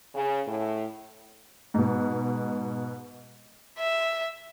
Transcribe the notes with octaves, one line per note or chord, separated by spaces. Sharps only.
C#3
A2
G#2 B2
E5